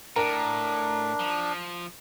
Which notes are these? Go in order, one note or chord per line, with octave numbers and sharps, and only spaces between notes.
A2 D4 A#4
F3